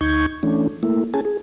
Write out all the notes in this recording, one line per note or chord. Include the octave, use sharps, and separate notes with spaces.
D2 D#4 C#6 G6 G#6
E3 A3 C#4 D4
A3 A#3 E4
C#4 G#4 G#5 A5
G#4